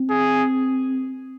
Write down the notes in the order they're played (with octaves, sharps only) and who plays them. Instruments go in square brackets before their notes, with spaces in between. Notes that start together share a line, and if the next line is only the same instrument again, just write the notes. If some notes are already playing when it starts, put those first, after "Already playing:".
Already playing: [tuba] C4
[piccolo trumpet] G#4